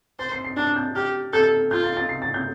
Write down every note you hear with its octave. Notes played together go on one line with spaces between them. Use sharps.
C5 A6
C7
C7
D4 A6
G6
G4 F6
A4 G6
F4 G6
A6
A6
C7
A6
G6